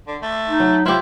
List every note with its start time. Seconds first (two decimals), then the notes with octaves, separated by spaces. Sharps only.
0.07 D3
0.22 A3
0.48 D#4
0.60 F#3
0.85 E4 F4 G4 C5